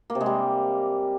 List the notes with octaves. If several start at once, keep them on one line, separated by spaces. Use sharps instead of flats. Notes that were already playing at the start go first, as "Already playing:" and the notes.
A#3
C3
G#3
G3